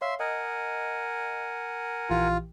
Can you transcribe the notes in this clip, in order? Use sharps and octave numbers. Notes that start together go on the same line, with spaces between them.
C#5 E5 F5 C6
A#4 D#5 F#5 G#5
A#1 E3 F4 G4